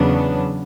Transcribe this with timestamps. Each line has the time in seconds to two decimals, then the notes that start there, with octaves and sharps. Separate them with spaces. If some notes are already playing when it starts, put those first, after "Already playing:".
Already playing: E2 C#3 F#3 B3 D4